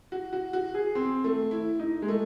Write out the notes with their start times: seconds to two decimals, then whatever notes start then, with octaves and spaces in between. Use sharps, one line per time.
0.12 F#4
0.33 F#4
0.53 F#4
0.74 G#4
0.95 C4
1.24 A3
1.51 E4
1.80 D#4
2.02 G#3
2.08 A3